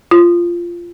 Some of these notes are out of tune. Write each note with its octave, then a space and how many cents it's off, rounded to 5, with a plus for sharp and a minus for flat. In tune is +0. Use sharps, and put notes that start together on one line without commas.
F4 -15